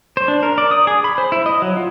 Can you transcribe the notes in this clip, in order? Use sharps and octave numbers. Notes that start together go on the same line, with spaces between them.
C5
D4
A#4
D5
D#6
G#4
B5
C5
E4
D#5
F#3
F4